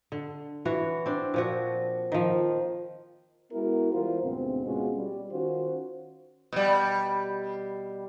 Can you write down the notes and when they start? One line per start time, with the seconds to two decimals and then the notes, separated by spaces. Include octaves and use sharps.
0.12 D3
0.65 E3 F#4 C#5
1.06 C4 D4
1.34 A#2 F3 F#4
2.12 D#3 F3
3.52 G#3 B3 E4 F#4 A#4
3.93 E3 G3 F4 A#4 C5
4.23 D2 G#2 B2 C4
4.64 B2 G#3 C#4 F4 F#4
4.95 G3
5.31 D#3 C#4 F4 F#4 C5
6.53 B2 G3